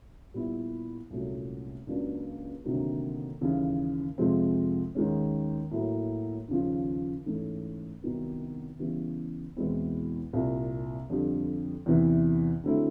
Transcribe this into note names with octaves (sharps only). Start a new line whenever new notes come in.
A#2 G3 B3 E4
C2 A#2 F#3 A3 C#4
C#2 C#3 F#3 A#3 D4
D2 C3 D#3 F#3 A#3
D#2 C#3 E3 G3
F2 C3 F3 G#3 C4
D#2 D#3 G#3 C#4
A2 F#3 A#3
D#2 C#3 F3
G#2 E3 A3 C#4
C2 C3 D#3 F#3 B3
C#3 E3 G3 B3
E2 B2 G#3 C4 E4
C2 A#2 G3 C4
F2 D3 G3
E2 C3 E3
D3 F#3 A3 C4 E4